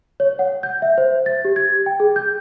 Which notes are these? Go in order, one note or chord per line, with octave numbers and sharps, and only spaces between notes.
C#5
F#5
G6
E5
C5
A6
G4
G#6
G5
G#4
G6